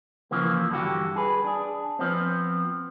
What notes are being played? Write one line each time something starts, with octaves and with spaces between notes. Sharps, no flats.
C#3 E3 F3 A#3
G2 D3 E3 F#4 G4
G#4 B4
D4 G#4
F3 B3 C4